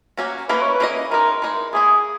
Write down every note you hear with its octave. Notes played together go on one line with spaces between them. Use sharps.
F#3 A#3 C#4 F#4
A#3 C#4 E4 A#4 B4 D#5
C#5
B4
A#3 C#4 E4 A#4 D#5
E3 G#3 D#4 A#4
E3 G#3 D#4
E3 A#3 E4 G#4